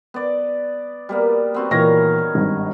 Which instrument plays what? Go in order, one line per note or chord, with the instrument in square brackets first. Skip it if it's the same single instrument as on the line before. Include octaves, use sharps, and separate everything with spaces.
[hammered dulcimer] B3 D5
G3 A#3 B3
B3 C4 F#4
[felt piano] A#2 E3 A#6 [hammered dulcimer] D#3 C#5 F5
[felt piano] G#1 G2